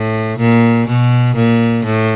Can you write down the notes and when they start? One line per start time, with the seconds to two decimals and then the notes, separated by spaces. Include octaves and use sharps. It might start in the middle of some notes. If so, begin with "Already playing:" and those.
Already playing: A2
0.39 A#2
0.88 B2
1.36 A#2
1.85 A2